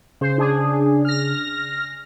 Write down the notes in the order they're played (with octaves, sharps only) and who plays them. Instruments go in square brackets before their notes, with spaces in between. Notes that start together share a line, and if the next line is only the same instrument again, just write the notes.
[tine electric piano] C#3 [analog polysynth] C5
[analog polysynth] D4 G#4
F6 A#6